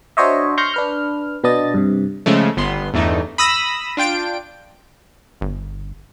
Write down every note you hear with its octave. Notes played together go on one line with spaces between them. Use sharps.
D4 F#4 C5 C#5 D#5 E5
C6 C#6 F6 G6 A#6
D4 B4 F6
B2 B3 D4 D#5 A6
G2 C3
C#3 F3 G#3 A3
G1 B3 C6
E2 G2 E3 A3 D#4
B5 D#6 E6 A#6
D4 F4 G5 D7
G1